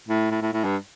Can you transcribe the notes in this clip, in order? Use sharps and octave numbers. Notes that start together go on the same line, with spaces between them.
A2
A2
A2
A2
G2